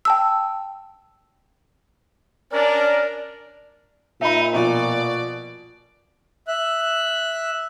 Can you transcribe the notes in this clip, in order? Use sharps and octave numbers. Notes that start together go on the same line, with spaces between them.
G5 A5 E6
C#4 D4 A#4 D5
A#2 D#4 E5 B5
B2 F3 D5
E5 F#6